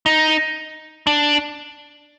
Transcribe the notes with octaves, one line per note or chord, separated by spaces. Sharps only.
D#4
D4